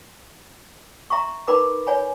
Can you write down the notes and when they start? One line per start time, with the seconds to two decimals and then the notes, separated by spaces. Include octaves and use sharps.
1.10 E5 A#5 C6 C#6
1.47 D#4 A#4 B4 B5 C6 D6
1.87 C#5 G#5 B5